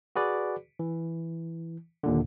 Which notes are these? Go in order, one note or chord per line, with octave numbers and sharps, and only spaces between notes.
F#4 G#4 B4 D5
E3
D#2 A#2 D3